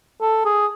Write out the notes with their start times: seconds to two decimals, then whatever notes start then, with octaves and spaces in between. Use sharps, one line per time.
0.21 A4
0.45 G#4